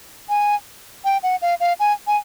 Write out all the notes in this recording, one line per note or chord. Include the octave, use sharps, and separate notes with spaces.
G#5
G5
F#5
F5
F5
G#5
G#5